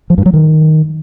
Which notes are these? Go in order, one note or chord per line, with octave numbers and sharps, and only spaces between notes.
F3
G2
F#3
D#3